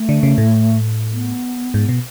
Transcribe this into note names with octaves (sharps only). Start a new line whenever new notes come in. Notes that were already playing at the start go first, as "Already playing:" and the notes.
Already playing: A3
D3
C#3
A2
B3
G#2
B2